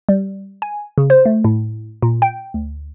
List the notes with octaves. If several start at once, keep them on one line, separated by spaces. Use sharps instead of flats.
G3
G#5
C#3
C5
A3
A2
A#2
G5
D2